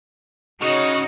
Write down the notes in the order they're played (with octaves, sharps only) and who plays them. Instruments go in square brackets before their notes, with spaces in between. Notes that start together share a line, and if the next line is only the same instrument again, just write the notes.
[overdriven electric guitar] C#3 [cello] D#4 F#4 [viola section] C#5 D#5